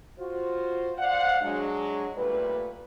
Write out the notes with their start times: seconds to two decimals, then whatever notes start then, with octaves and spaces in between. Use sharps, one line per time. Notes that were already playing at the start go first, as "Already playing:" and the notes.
0.19 F4 F#4 C5
0.98 C5 D5 F5 F#5
1.42 F#3 G#3 D4
2.17 B1 A#2 G3 A3 B4